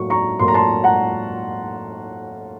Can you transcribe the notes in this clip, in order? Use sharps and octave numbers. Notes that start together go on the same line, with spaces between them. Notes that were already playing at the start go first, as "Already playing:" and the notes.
Already playing: A2 F#3 A#3 C#6
A#5 C#6
A2 F#3 A#3 C6
A#5
A5 C6
F#5 A#5